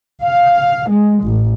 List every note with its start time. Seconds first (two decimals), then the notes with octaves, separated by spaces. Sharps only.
0.24 F5
0.89 G#3
1.25 A1